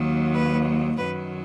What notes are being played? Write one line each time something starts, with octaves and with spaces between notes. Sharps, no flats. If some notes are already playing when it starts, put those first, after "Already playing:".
Already playing: D#2 D#3 F#3
B4
F#2 D#3 F#3 B4